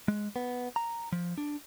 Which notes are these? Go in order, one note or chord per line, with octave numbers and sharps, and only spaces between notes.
G#3
B3
A#5
F3
D4